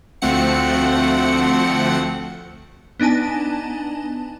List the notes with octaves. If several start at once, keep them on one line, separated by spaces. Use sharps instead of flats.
D2 F3 A3 C4 F#5 C#7
B3 D4 D#4 G#5 A5